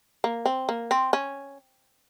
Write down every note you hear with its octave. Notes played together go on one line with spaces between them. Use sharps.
A#3
C4
A#3
C4
C#4